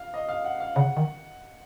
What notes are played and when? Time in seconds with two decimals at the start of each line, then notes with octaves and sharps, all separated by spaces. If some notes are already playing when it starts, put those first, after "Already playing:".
Already playing: F5
0.14 D#5
0.29 F5
0.44 F#5
0.60 F5
0.75 C#3 F#5
0.97 D#3